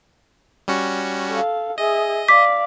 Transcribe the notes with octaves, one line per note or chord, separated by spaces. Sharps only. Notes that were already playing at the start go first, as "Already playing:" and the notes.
G3 C#4 F#4
A4 F5
G#4 D#5 E5
D5 F5 D6 B6